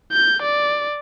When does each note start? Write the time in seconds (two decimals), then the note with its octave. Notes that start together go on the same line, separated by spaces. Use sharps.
0.12 G6
0.42 D5